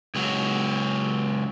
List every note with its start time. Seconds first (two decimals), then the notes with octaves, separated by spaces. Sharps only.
0.15 C#2 F#3